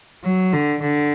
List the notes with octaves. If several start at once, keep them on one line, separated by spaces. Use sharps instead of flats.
F#3
D3
D3